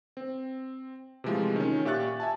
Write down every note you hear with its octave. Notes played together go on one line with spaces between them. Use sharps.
C4
C3 E3 F3 G#3 A3 F4
D#3 C#4
A#2 G4 E5 C#6 F#6 A6
E5 G#5 A5